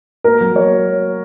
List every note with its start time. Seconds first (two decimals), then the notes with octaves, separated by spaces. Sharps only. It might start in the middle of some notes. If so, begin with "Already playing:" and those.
0.24 A#3 A#4
0.41 F#3
0.55 A#3 C#5